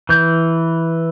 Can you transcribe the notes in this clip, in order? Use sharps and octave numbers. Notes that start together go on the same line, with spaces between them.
E3 G6